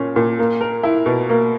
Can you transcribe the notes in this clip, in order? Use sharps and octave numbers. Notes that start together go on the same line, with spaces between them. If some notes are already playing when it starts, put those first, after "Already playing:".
Already playing: A#2 C#4
A#2
A#3
A#4
E4
B2
A#3